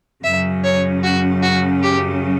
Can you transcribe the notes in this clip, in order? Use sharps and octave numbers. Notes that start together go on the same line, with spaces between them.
F#2 C#3 F#3 C#4 E5
C#5
F#4
F#4
G4